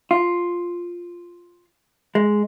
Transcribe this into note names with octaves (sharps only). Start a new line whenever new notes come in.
F4
G#3